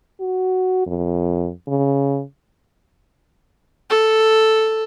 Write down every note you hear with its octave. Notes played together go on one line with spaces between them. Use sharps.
F#4
F2
C#3
A4